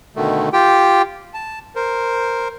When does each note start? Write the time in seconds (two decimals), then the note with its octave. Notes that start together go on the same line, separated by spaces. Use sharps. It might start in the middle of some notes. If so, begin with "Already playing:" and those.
0.16 B2 D3 D#3 A3
0.53 F4 G4 G5
1.34 A5
1.75 A#4 C5